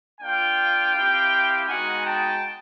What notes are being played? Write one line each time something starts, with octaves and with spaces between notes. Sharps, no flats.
A#3 D4 F4 F5 G5
C4 E4 G4
G#3 B3 D#4 F#4 F#5 G#5
G5 A5